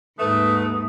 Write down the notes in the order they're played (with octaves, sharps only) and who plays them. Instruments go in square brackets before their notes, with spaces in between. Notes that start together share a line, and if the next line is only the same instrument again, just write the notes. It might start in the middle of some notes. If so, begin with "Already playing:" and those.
[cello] D#2 G#2 [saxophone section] A3 B4 [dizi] D#6